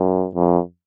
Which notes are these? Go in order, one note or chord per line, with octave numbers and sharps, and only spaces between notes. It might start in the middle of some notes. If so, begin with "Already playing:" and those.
Already playing: F#2
F2